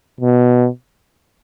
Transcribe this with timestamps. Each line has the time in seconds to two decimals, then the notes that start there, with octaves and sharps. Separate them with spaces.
0.21 B2